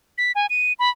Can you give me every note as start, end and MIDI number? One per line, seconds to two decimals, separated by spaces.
0.18 0.32 95
0.35 0.47 80
0.50 0.73 99
0.79 0.90 83